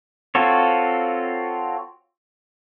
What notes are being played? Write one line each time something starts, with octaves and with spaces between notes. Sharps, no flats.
C4 F4 F#4 A4 C#5